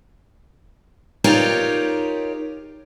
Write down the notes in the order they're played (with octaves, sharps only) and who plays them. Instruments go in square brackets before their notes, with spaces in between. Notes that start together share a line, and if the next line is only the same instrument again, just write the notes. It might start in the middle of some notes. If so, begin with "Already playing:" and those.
[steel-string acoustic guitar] D#4 F4 G4 A#4 C#5 D5